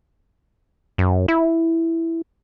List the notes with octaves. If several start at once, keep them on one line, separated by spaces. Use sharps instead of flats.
F#2
E4